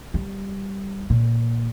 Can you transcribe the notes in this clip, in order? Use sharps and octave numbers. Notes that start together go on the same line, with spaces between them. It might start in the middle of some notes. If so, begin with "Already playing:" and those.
G3
A#2